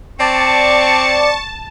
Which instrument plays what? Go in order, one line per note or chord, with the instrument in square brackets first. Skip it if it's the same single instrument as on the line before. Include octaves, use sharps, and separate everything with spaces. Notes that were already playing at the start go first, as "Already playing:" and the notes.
[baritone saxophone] C4 [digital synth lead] D5 [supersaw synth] A5 [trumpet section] C#6